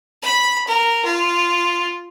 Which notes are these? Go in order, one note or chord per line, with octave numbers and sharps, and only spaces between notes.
B5
A#4
F4